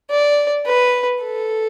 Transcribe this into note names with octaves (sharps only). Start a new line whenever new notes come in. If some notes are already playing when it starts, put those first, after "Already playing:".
D5
B4
A4